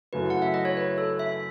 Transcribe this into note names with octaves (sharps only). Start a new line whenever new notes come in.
F#2 C#3 F#3 A3 E4 B4
F#5
E5
D#5
C#5
B4
A4
E5